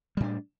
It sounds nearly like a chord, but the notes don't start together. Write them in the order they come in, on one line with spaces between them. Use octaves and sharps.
G3 A2 D4